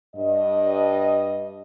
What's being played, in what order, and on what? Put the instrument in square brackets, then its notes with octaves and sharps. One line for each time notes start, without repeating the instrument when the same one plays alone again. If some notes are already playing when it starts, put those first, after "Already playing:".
[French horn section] G2 D#5